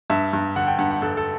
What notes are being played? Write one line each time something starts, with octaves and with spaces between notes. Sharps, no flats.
G2 E5
G2
D3 F#5
G5
G2 F#5
F#5
G2 A4
A4